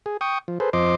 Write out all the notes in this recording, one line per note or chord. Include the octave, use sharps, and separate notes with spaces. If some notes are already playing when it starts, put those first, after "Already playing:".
G#4
G5 C#6 D#6
F3
G#4 A4 B4 C5
F2 F3 C5 D#5 C6 D6